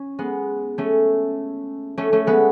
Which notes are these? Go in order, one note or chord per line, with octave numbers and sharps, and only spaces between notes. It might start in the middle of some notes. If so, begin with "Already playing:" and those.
Already playing: C#4
G#3 B3
A3 C#4
A3 C#4
A3 C#4
G#3 B3